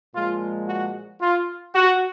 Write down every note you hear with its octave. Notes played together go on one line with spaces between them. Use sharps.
A#2 F3 G#3 F4
F#4
F4
F#4